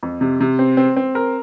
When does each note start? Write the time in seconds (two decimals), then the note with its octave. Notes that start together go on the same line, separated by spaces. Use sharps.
0.03 F2
0.21 C3
0.41 C3
0.59 C4
0.77 C4
0.96 C4
1.15 A#4